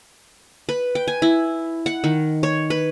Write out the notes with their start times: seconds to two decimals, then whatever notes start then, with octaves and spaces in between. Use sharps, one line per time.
0.69 B4
0.95 G5
1.08 G#5
1.22 E4
1.86 F#5
2.04 D#3
2.43 C#5
2.70 B4